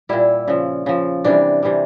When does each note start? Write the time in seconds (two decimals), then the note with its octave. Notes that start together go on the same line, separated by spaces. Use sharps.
0.09 A#2 G3 E4
0.48 C#3 F3
0.86 C#3 F3
1.24 C3 E3 G3 D4
1.63 C3 E3 G3